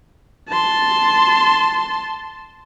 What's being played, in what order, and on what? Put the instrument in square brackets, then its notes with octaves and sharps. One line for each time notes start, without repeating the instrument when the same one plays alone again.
[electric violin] A5 C6